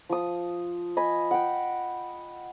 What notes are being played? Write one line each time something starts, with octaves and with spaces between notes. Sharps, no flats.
F3 D#6
D#5 G#5 B5
F#5 G5